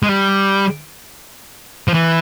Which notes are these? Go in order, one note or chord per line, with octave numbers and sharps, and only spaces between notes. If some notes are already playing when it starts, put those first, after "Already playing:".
G#3
G3
F3
E3